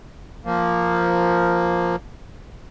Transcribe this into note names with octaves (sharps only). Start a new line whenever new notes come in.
F3 A#3